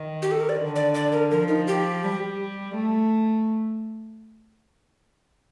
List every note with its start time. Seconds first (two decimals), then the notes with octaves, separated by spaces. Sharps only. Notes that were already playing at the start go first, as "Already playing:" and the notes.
Already playing: D#3
0.22 G4
0.31 A4
0.40 A#4
0.49 D5
0.58 D3
0.76 D5
0.94 D5
1.12 A#4
1.31 F3 A#4
1.48 D#4
1.67 G4
2.03 G3
2.75 A3